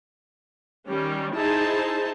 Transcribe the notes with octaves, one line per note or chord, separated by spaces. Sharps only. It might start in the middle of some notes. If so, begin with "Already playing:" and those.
D#3 G3 C#4
D#4 E4 G#4 C5 A5